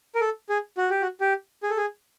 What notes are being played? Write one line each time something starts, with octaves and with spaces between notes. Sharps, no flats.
A#4
A4
G#4
F#4
G4
F#4
G4
G#4
A4
G#4